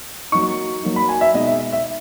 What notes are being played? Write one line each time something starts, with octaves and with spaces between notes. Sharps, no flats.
F#3 A#3 D#4 C#6
F#3 A#3 D#4
B5
G#5
E5
B2 G#3 D#4 D#5
E5
E5